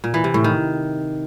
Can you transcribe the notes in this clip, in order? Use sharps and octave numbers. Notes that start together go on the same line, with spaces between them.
A#2
E3
C3
A2
D#3